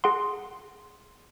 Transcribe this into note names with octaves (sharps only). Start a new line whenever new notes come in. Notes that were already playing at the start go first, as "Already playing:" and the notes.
G#4 F#5 C6